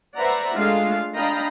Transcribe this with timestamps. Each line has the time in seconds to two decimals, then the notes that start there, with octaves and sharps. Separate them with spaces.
0.17 B4 C5 D5 E5 F#5 A#5
0.55 G#3 A3 D4 F4 F5
1.15 D4 D#5 F5 G5 A#5 B5